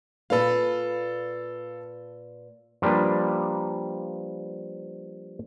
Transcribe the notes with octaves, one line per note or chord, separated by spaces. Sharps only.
A#2 A4 B4 F5
F3 G3 A#3 D4 B4